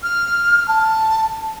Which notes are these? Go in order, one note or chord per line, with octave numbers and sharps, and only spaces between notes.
F6
A5